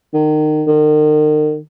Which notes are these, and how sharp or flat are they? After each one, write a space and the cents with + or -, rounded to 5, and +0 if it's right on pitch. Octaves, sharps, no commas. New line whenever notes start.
D#3 -25
D#3 -40